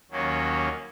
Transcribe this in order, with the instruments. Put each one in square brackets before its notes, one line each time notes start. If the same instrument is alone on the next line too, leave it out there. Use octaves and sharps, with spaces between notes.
[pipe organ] D#2 D#3 F#3 A#3 C#4